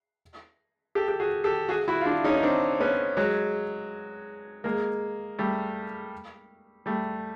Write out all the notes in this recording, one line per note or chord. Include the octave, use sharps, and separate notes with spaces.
G4 A4
G4
F#4 G#4
G4 A4
F#4 G#4
E4 F#4
F4
D4 E4
C#4 D#4
D#4
C4 D4
B3 C#4
F#3 G#3
G#3 A#3
G3 A3
G3 A3